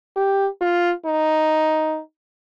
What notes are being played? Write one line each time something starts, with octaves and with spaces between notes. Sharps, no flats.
G4
F4
D#4